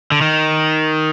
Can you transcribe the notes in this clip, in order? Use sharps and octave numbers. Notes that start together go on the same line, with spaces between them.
D3
D#3